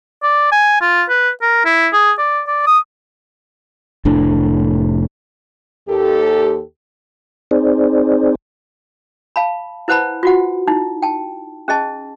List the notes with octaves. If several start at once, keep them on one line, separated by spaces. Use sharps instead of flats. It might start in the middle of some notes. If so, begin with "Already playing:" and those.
D5
G#5
F4
B4
A#4
E4
G#4
D5
D5
D#6
F1 A2 D4
D#2 G4 A4
C4 D#4 G#4 C5 D5
F5 A5 B5
E4 B4 C5 F#5 A5 B5
F4 F#4 F#5
D#4 E4
G5 A5
C#4 G#4 D#5 A5